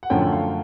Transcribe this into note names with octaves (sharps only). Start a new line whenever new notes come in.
F#5
F#2 D3 F3 A3 C#4 G5
F5